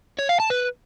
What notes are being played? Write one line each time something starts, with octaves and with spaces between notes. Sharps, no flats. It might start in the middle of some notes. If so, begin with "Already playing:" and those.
C#5
F5
A5
B4